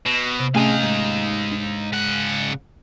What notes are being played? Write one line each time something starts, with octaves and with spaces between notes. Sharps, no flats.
B2
C3
A2 C3 A3 C#4 D#4 G#4 F5
G#2
D4
C#3 F#5